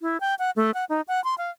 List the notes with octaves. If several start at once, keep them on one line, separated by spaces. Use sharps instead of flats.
E4
G5
F#5
A3
F#5
D#4
F#5
C6
F5